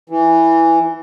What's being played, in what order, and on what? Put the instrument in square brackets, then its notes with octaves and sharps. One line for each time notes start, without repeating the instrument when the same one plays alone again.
[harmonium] E3